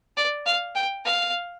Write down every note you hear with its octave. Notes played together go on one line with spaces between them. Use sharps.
D5
F5
G5
F5